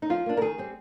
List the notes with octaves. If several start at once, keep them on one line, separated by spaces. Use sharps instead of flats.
D#4
F3 F4
A#3 D4
A#4
D#3 G#4
G3 C4